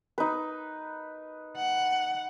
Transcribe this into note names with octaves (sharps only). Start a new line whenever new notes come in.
D#4 B4
F#5